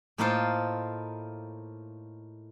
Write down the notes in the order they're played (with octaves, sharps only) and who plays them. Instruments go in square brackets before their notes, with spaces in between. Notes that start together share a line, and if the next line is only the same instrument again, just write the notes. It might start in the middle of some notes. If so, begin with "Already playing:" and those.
[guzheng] A2 A#3 D#4 F4 A4 C5